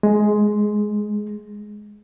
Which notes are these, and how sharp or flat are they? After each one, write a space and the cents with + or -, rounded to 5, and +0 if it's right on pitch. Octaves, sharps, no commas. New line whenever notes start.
G#3 +10